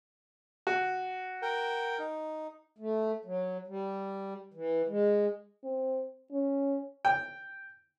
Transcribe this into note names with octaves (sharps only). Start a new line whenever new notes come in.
F#4
A#4 G5
D#4
A3
F#3
G3
E3
G#3
C4
C#4
G5